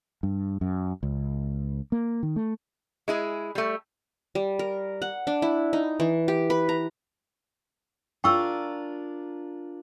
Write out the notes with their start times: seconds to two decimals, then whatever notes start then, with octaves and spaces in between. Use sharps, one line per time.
0.23 G2
0.61 F#2
1.03 C#2
1.92 A#3
2.23 D#3
2.36 A3
3.08 G#3 E4 G#4
3.55 G3 A3
4.35 G3
4.59 A#4
5.02 F#5
5.27 D4
5.42 E4
5.73 D#4
6.00 E3
6.28 G4
6.50 B4
6.69 A#5
8.24 D4 F4 A#4 G5 C#6 E6